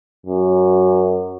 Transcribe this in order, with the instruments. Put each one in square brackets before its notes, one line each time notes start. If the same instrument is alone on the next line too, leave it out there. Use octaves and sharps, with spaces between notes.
[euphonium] F#2